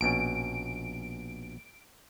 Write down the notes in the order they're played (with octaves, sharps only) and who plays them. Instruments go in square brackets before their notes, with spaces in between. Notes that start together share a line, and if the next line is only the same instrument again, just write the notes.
[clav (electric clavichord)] A#1 B2 C#4 [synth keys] D7